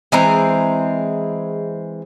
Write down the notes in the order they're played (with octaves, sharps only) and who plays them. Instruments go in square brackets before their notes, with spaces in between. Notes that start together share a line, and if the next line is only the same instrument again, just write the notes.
[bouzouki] E3 G#3 C4 A#5